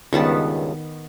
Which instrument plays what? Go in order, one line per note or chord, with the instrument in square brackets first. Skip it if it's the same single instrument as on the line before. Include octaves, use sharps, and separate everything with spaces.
[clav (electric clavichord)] C#2 G2 [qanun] D#3 B3 A5